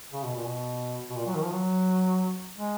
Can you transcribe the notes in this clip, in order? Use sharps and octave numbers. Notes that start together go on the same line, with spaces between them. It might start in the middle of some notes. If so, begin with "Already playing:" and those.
C#3
B2
A#2
B2
B2
A#2
F#3
D#3
F3
F#3
G#3